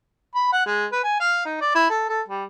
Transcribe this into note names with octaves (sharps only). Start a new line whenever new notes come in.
B5
F#5
G#3
B4
G#5
F5
D#4
D5
E4
A4
A4
G3